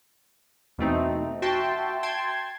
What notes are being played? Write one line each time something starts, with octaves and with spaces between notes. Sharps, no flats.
E2 B2 A3 C4 D#4
F#4 E5 G5 A5 C6
G5 A5 C6 G#6